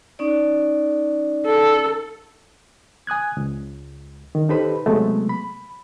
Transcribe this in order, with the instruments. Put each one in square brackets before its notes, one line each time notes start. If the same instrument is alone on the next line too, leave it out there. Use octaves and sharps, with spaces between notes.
[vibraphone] C#4 D#4 D5
[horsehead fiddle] A4
[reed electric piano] G#5 D#6 F#6 G#6
C#2
D#3
D#4 G4 A4 B4 C5 B5
C3 F#3 G#3 A3 B3
B5